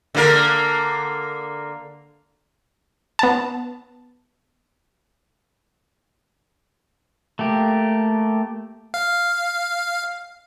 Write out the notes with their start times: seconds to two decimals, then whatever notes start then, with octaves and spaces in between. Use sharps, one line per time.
0.15 D3 A#3 A#4
3.19 B3 A5
7.39 A3 A#3 G4
8.94 F5